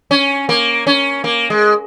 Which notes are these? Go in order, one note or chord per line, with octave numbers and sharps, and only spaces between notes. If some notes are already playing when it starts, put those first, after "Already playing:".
C#4
A#3
C#4
A#3
G#3